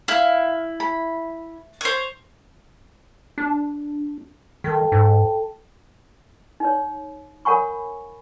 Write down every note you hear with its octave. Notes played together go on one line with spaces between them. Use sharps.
E4 F5
B5
C5 C#5
D4
D#3 A4 G5 A5
G#2
D#4 C#5
A#4 C#5 F#5 G#5 B5 C#6